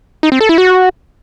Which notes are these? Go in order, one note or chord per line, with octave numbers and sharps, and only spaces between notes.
D#4
C4
A4
E4
F#4